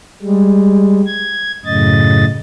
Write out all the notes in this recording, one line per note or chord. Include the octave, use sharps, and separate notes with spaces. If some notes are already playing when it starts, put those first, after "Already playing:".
G3 G#3
G#6
F#2 A2 C#3 D#5 A6